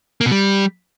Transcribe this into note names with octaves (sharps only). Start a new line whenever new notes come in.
A#3
B2
G3